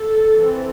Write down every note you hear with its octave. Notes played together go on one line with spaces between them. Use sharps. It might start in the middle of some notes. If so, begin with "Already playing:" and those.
Already playing: A4
E3 C4